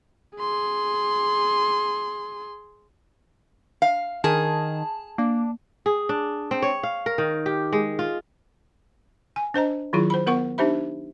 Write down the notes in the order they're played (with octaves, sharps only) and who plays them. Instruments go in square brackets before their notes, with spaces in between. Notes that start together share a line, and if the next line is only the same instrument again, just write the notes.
[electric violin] G#4 C6
[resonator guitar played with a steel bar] F5
[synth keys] D#3 [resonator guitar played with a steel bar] G#4 [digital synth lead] A5
[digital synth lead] A#3 [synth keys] D4
[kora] G#4
D4
C4
C#5
F5
A#4
D#3
G4
G#3
F4
[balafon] G#5
D4 C5 D#5 A#5
D#3 F#3 E4 F4 G#4
C5 B5
B3 A#4 F#5 C#6
D4 D#4 G4 C5 E5 B5